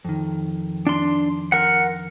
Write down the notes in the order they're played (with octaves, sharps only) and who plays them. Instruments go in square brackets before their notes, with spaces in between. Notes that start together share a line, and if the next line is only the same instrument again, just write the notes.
[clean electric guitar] F2 D#3
[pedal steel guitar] D4 C6
A#4 F#5